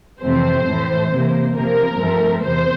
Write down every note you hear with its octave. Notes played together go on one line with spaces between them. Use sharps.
F2 C3 E3 A3 C4 C5
A2 E3 A3
C3 E3 A#3
C3 F3 A#3 A#4
G2 F3 A3 C4
E2 C3 E3 C5